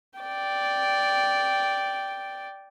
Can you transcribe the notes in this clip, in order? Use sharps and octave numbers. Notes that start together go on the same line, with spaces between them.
D5 G5